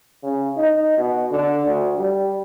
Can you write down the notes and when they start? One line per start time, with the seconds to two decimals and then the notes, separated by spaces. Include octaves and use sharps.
0.23 C#3
0.57 D#4
0.97 B2
1.31 D3
1.66 D2
1.98 G3